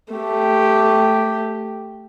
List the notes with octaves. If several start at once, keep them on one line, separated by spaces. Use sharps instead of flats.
A3 G4